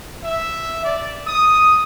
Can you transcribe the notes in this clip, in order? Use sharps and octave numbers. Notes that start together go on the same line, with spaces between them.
E5
D5
D#6